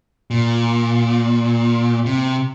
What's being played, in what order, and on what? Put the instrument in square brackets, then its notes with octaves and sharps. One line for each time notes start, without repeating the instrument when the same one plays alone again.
[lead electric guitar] A#2
C3